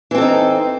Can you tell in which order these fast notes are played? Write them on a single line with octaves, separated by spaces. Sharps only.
E3 C4 A4 D#4